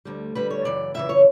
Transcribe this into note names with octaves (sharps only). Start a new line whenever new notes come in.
D2 D3 G3
D2 D3 G3 B4
C#5
F#2 C#3 E3 D5
F#2 C#3 E3 E5
C#5